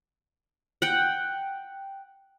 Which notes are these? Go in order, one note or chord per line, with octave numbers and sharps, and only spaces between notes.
F#5 G5